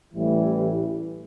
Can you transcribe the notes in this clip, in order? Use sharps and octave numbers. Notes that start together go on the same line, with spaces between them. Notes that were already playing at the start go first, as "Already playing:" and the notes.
A1 A2 E3 G3 E4